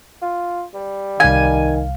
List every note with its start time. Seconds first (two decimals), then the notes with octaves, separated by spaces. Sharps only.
0.22 F4
0.74 G3
1.20 C2 D#3 F5 G#5